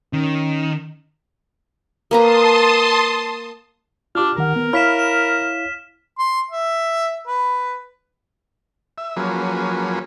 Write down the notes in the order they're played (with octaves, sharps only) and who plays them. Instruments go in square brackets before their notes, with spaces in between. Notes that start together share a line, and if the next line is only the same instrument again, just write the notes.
[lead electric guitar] D#3 [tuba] C#4
[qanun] A#3 B4 A#5 [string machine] A5 C6 D#6
[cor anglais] D4 [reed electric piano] F4 D6 [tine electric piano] G4 F6
[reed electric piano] C2 D#3 F#5 [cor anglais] A#4
[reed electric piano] B3
[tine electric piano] E4 C#5 F5 [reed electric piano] B5 [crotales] F6 B6 E7
[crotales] E7
[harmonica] C6
E5
B4
[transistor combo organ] E5
F3 F#3 A#3 C#4 G#4 B4